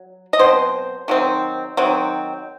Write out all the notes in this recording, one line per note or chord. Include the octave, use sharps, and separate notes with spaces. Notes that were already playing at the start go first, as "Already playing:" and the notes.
Already playing: F#3
D#5
B2 F#3 C4 C5
D#3 F#3 C4
D#3 F#3 C4